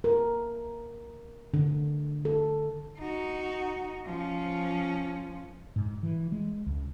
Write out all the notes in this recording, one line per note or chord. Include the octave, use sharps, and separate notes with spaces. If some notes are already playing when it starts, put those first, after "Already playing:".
A#4
D3
A4
D#4 F#4
F3 C#4
G#2
E3
G#3
C#2